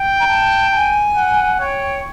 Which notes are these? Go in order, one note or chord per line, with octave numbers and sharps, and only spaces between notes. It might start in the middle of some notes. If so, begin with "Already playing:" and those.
Already playing: G5
A#5
A5
A5
G#5
F#5
C#5 G5